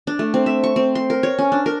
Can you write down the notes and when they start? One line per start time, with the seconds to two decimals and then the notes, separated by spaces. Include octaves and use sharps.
0.07 D4
0.19 A3
0.34 C4
0.46 E5
0.64 C#6
0.76 C4
0.95 C6
1.10 A#4
1.23 C#5
1.39 C#4
1.52 D4
1.66 A#4